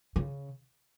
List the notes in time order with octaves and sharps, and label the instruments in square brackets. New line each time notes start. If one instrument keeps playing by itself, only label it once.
[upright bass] C#3